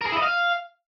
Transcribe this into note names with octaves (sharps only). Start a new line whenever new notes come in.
A#4
G#4
E4
D#5
F5